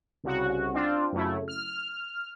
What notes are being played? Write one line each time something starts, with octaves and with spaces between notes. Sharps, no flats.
C2 C#3 F#4
C4 D4 F4
F#2 C#3 A3 E4
F6